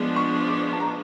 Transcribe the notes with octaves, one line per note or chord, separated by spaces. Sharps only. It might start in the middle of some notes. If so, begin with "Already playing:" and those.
Already playing: F3 G#3 B3 D4 C6
C#6
D6
A5
A#5